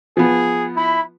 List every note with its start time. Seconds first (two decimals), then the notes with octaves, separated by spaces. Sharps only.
0.17 F3 B3 G#4
0.76 E4 B5